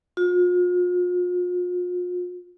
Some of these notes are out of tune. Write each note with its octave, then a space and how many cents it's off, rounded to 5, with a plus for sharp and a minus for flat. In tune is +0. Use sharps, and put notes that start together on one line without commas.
F4 +40